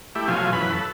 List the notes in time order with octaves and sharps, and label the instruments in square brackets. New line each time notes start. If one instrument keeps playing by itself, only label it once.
[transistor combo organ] A3 E4 G4
B2 F3 F#3 A3 F5 G#5
F#2 E3 B4 B5
A4